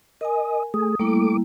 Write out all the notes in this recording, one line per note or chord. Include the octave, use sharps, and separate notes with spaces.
A#4 D#5 G#5
A3 G#4 D#6
G3 A3 A#3 E4 D6